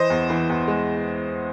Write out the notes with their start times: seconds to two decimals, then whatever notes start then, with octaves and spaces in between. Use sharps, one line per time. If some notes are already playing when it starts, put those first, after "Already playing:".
Already playing: E3 C5 D#5
0.10 E2
0.30 E3
0.49 E2
0.68 G#3